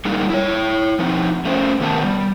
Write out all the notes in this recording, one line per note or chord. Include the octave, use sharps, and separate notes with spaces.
G3 G#3 A#3 D#4
E4 C#5
F3 C4 D#4
A3 C#4 C5
C3 D#3 B3 A#4 A5
G3